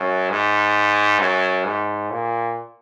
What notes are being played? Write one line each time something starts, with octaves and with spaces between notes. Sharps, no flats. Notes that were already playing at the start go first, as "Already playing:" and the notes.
Already playing: F#2
G#2
F#2
G#2
A#2